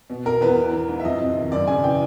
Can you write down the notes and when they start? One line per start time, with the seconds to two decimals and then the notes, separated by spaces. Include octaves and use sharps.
0.10 B2
0.25 B2 A#4
0.41 E2 B4
0.57 E3
0.73 E3
0.89 G#2
1.00 E5
1.04 F2 D#5
1.20 C3
1.36 D#3
1.52 F#2 D5
1.67 C#3 G#5
1.83 E3 G5